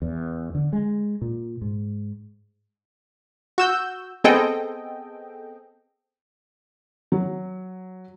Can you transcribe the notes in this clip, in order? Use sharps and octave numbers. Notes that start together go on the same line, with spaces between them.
E2
D3
G#3
A#2
G#2
F#4 E6 G6
B3 C4 G#4 A4 D#5 G5
F#3